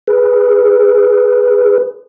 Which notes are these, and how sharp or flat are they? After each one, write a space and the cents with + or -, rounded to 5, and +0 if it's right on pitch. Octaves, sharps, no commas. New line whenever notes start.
G#4 +0 B4 +0